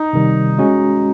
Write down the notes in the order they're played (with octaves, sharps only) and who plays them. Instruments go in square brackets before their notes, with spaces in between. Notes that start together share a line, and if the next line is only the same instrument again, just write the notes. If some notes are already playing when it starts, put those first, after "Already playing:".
Already playing: [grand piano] D#4
[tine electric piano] C3 D#3 G3
G#3 C#4 F#4